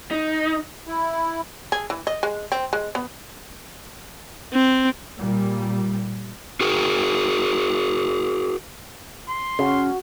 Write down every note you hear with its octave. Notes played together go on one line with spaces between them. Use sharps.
D#4
E4
G#4
E3
D#5
G#3
C4
G#3
B3
C4
A#2 G3
F#4 G#4 A#4
C6
C#3 C#4 F#4